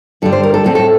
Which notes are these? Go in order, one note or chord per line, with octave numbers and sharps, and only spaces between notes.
G2 D3 G3 A4
C5
A#4
A4
A2 A3 C4 A4
A4